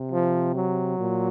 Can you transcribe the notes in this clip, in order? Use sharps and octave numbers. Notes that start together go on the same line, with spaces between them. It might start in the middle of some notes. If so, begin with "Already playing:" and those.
Already playing: C3
F3
F#3
A#2